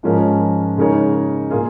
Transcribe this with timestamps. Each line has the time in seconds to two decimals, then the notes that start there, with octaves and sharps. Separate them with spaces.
0.03 G#2 F3 G#3 C#4 A#4
0.77 C#3 G#3 D#4 A#4 C#5
1.50 A#2 A#3 F4 G#4